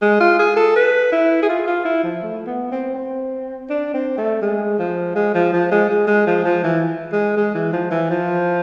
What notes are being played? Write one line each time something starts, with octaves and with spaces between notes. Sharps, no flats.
G#3
F4
G#4
A4
B4
E4
G#4
F4
F4
E4
F3
A3
B3
C4
C4
D4
C4
A3
G#3
F3
G#3
F3
F3
G#3
G#3
G#3
F3
F3
E3
G#3
G#3
E3
F3
E3
F3